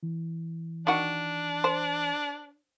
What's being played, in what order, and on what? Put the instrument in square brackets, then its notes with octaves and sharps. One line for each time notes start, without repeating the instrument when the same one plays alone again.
[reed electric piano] E3
[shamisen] D#3 F#4 [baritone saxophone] D4
[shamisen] C5